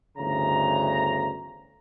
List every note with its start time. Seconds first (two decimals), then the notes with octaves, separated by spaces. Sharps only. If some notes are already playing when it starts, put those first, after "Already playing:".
0.17 G1 D2 C#3 E3 A#5